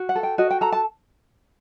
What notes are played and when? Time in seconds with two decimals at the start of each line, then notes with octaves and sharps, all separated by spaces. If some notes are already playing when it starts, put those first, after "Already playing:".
Already playing: F#4
0.09 F#5
0.16 A4
0.23 G5
0.38 F#4 D#5
0.51 G5
0.61 A4 A#5
0.72 A5